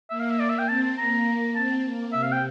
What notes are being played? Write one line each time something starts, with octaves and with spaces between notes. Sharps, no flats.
A#3 E5
F5
E5
D5
E5
G5
C4 A5
A5
A#3 A#5
C4 A5
A#3
C3 E5
F5
G5